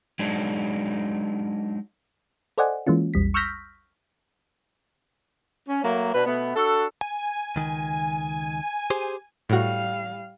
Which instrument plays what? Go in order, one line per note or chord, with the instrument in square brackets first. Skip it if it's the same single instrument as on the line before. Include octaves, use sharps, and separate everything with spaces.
[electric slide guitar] F#3 G#3 D4 D#4
[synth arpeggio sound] A4 C5 D5 D#5 F#5 G#5
E3 G#3 A#3 C#4 F4
A#1 E2 G3 B6
C#6 E6 F6 G6 A#6 B6
[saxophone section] C#4
F#3 A3 A#3
B2 D4 B4
B2 A3 B3
D4 F#4 A4
[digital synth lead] G#5
[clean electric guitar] C#2 D#3
G4 G#4 C5
[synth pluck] A2 F#4 [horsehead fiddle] G3 F5